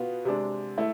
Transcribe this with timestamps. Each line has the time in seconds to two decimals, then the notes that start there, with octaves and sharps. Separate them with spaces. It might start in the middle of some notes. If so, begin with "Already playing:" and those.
Already playing: B2 B3 F4
0.25 C3 G#3 D4
0.78 A3 E4